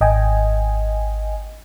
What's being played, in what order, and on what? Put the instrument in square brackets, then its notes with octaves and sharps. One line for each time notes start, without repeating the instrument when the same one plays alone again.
[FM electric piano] G#1 D#5 G5 G#5